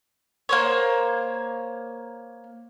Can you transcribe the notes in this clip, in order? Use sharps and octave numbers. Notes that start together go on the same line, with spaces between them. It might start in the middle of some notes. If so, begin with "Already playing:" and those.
A#3 C5 C#5